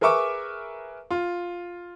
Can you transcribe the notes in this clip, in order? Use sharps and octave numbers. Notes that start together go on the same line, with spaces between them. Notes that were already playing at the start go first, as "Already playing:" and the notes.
G#4 A#4 B4 E5 C#6 D6
F4